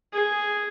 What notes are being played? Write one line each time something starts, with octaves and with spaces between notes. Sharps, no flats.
G#4